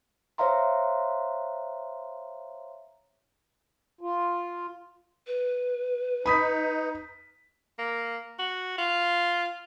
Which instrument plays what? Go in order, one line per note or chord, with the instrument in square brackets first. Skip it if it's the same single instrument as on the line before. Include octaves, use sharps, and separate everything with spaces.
[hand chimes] C5 C#5 E5 F5 A#5 C6
[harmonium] F4
[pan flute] B4
[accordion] D#4 [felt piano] B5 D#6 B6
[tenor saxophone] A#3
F#4
F4